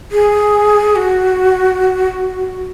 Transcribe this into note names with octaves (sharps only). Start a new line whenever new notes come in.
G#4
F#4